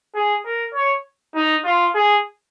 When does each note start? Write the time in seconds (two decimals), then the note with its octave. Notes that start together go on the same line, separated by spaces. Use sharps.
0.15 G#4
0.45 A#4
0.74 C#5
1.35 D#4
1.65 F4
1.95 G#4